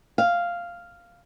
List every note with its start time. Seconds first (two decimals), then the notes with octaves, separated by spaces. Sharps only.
0.18 F5